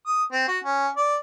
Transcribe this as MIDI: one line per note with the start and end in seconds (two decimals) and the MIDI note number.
0.06 0.23 87
0.32 0.47 60
0.48 0.59 66
0.64 0.88 61
0.96 1.17 74